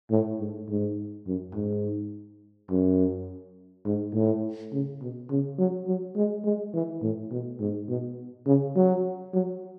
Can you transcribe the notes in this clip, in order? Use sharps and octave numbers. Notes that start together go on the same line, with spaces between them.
A2
G#2
G#2
F#2
G#2
F#2
G#2
A2
C#3
B2
C#3
F#3
F#3
G#3
G#3
E3
A2
B2
G#2
B2
C#3
F#3
F#3